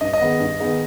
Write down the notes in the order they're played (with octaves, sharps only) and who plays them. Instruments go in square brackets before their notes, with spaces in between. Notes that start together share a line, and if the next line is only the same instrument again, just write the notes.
[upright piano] G2 [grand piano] D#5
[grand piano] D#5
[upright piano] D#3 B3 D#4 G#4
G2
D#3 B3 D#4 G#4